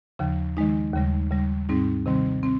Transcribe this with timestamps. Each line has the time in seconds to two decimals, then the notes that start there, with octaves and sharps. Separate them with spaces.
0.19 D#2 C#3 F3
0.57 D#3 G#3 D#4
0.93 D#2 C#3 G3
1.31 D#2 C#3 G3
1.69 G#2 G3 C4 D#4
2.06 C3 D#3 G3 C4
2.43 C4